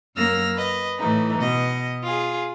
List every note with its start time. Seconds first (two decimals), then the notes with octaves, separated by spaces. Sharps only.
0.17 F#2 F#3 A#3 E6 F6 A#6
0.56 B4 D#5
0.98 A2 E3 D#4
1.39 B2 D#5
2.04 F4 G#4